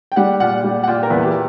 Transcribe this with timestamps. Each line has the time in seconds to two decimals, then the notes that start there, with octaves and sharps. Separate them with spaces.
0.12 G5
0.16 G3 F#5
0.40 A#2 F#5
0.64 G3
0.84 F#5
0.87 A#2 G5
1.03 A#4
1.10 E2 B4
1.22 G4